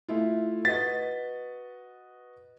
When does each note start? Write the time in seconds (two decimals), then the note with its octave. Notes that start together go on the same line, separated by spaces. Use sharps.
0.08 A3 E4 F4
0.65 F#4 B4 D#5 A6 B6